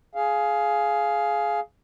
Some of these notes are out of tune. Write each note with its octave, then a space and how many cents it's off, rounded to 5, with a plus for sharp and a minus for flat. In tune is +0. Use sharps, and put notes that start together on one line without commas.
G#4 +15 F5 +0